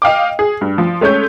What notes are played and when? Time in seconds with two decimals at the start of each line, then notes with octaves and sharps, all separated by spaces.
0.02 D#5 F5 G5 D6
0.39 G#4
0.61 G2
0.78 F3
1.01 G#3 A3 C#4 C#5 G6